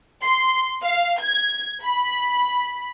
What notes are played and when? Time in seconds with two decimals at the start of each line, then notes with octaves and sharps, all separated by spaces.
0.23 C6
0.83 F5
1.20 G#6
1.83 B5